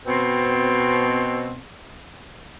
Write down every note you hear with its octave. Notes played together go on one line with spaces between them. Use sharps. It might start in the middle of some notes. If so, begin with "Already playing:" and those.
B2 C4